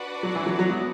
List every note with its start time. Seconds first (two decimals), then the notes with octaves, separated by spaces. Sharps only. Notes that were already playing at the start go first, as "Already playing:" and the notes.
Already playing: D4 F#4 B4 D5 F#5
0.23 F#3
0.35 E3
0.46 F#3
0.59 F#3
0.70 B3